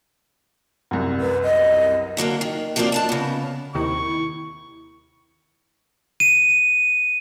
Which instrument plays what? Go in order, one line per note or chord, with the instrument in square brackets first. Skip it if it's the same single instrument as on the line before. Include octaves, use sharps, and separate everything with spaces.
[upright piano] C2 F#2
[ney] B4
D#5
[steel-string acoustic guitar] D3 F#3 G#3 A#3
D#3
F3 F#3 A#3 C4 F4 D5
D#2 D4 A5
C#3 B3
[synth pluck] D#2 C3 D#3 [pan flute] E4 [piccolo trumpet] C#6
[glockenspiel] D#7